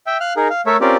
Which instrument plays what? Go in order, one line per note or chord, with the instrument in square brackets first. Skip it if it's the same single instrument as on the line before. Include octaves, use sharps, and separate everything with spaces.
[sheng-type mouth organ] E5 G5
F5 F6 F#6
D#4 G#4 A#4
F5
A3 A4 A#4 C#5 E5
C4 C#4 F4 G4 A#4 D5